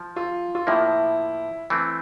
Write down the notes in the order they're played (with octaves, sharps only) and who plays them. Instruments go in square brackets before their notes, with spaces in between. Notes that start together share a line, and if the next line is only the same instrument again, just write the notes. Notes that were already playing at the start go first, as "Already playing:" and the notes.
Already playing: [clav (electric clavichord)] F3
[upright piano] F4
F4
[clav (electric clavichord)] A2 F3 A#3 [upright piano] E4
[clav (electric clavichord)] E3 A3 C4